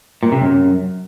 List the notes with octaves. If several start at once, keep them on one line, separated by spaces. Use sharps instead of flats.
A#2
C3
F#2